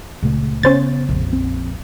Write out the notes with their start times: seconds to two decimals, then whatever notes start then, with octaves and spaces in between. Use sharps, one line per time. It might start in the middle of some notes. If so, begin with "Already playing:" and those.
0.23 C#2 A#2 C#3 A3
0.63 C#3 B3 C#4 C5 A6
1.09 A#1 F2
1.33 C4